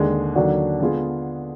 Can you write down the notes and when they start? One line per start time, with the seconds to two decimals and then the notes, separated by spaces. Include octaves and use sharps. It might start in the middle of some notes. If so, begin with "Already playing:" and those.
Already playing: D#2 D3 G#3
0.35 D#2 D3 F#3 D4 F#4
0.80 D3 G#3 B3 F4 G#4